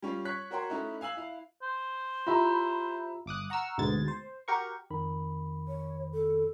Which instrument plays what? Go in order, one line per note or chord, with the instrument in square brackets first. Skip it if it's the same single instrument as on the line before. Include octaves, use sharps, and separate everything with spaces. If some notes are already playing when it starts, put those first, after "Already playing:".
[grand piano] G3 C#4 F4
C#5 C#6 F#6 B6
F#4 A#4 C#5 G5 C6
A3 C#4 D#4 E4
F5 G#5 E6 F#7
E4 F5
[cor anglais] C5
[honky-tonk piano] E4 B5 [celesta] F4 G4 A#5
[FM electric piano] G1 D6 D#6 F#6
F#5 A#5 C#6 E6 F6
D2 G#2 B2 G#6 A6
C5
F#4 G4 A#4 C#6
[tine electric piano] F2 D#3 B5
[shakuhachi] C#5
A4